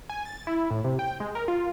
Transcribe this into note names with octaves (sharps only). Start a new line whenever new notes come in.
G#5
A6
E4
A2
C3
G5
G#3
A#4
F4